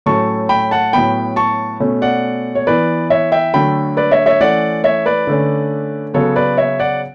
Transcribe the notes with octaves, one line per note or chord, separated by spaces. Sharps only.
A2 F#3 A3 C#4 A5 C#6
G5 B5
F#5 A5
A2 F#3 B3 G5 B5
A5 C#6
B2 A3 C#4
D5 F#5
C#5
E3 B3 B4 D5
C#5 E5
E5 G5
D3 F#3 A3 G5 B5
B4 D5
C#5 E5
C#5 E5
E3 A3 C#4 D5 F#5
C#5 E5
B4 D5
D3 A3 C#4
C#3 F#3 B3 A4 C#5
B4 D5
C#5 E5
D5 F#5